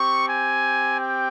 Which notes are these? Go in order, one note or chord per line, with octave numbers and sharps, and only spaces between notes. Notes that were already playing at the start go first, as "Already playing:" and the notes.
Already playing: C4 G4 C#6
G#5
G5